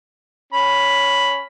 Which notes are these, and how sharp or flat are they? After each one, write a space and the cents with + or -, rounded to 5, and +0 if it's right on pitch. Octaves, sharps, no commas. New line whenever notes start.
C#4 +5 B5 +0